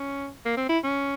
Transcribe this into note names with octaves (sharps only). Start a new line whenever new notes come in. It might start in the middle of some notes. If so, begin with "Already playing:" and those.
Already playing: C#4
A#3
C4
E4
C#4